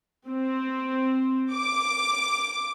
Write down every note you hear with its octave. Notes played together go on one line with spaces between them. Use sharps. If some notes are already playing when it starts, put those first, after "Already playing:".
C4
D6